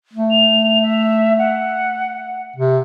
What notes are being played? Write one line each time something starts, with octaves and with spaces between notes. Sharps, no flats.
A3
F7
E5
F#5
C3